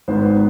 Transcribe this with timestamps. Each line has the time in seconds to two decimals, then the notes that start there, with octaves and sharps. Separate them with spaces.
0.08 G#1 G#2 D#3 B3 C5
0.22 B4